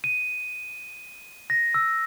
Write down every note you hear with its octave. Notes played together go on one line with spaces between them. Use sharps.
D#7
A#6
E6